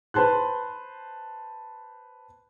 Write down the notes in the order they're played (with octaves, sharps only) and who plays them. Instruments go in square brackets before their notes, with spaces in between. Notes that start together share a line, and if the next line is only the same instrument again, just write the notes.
[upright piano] B4 C5 A5 C6 F#6